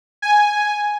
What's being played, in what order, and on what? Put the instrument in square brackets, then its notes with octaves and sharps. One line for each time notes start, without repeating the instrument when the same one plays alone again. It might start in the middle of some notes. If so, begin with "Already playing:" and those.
[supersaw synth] G#5